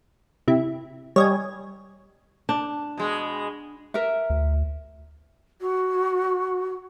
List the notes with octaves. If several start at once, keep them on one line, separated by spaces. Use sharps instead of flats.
C3 E4
G3 C#5 D#5 G#5
D4
B2 G#3
A#4 E5
D2
F#4